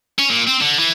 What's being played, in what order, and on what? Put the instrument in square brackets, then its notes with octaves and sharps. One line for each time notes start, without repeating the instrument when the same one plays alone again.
[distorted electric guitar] C#4
A#2
C4
D3
E3